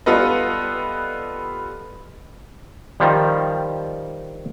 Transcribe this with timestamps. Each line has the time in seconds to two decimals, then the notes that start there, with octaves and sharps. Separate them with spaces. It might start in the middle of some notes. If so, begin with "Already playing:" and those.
0.06 G3 B3 F4 A4 B4 D#5
3.00 D#3 F3 G3